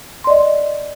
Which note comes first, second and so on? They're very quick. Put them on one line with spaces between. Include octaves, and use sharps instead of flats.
C6 D5 D#5